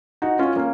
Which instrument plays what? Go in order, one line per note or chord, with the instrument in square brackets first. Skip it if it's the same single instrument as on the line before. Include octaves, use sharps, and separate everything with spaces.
[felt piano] D#4 F#4
C#4 F4
A#3 C#4